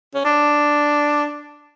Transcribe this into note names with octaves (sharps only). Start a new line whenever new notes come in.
C#4
D4